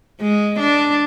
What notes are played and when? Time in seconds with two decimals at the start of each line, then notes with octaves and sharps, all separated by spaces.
0.21 G#3
0.60 D4